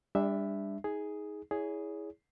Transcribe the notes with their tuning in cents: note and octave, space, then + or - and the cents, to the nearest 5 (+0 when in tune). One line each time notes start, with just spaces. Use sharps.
G3 +35 D4 +0 E5 +0
D#4 +30 G#4 +0
E4 -15 G#4 +0 C#5 +30